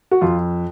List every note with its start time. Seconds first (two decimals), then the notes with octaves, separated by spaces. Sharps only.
0.11 F#4
0.21 F2 F4